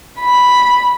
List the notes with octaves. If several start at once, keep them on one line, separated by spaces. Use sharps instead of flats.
B5